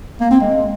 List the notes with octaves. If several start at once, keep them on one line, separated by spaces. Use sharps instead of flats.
A#3
C4
G#3